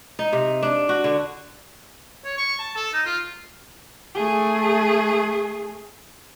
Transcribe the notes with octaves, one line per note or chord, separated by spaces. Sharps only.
D#4
C3
D4
F#4
D3
C#5
C#6
A5
A4
D#4
F4
A3 G#4